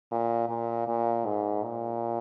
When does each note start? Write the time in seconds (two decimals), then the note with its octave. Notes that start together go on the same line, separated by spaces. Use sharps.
0.12 A#2
0.49 A#2
0.88 A#2
1.25 G#2
1.64 A#2